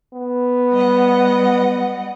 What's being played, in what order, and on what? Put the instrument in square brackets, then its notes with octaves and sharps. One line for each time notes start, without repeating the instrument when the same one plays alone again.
[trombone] B3
[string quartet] G3 D#5 F#5